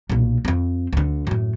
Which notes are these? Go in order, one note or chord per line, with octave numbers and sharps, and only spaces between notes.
B1 A#2
F2 C4
D2 D3
F#2 A2